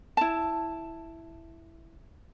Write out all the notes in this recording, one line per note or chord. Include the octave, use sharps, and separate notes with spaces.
E4 A5